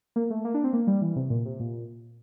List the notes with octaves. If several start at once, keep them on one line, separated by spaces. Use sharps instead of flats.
A#3
A3
A#3
D4
C4
A#3
G3
E3
C3
A#2
C3
A#2